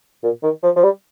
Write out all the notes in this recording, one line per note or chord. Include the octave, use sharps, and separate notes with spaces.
A#2
D#3
F3
F3
G3